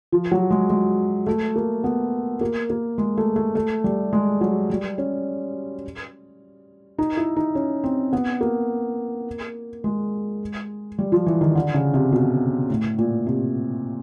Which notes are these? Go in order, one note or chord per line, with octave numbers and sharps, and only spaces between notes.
F3
F#3
G#3
G#3
A3
A#3
B3
A#3
A#3
G#3
A3
A3
A3
G3
G#3
F#3
G3
C#4
D#4
E4
D#4
C#4
C4
B3
A#3
G#3
G3
F3
E3
D#3
D3
C#3
C3
B2
A2
A#2
C3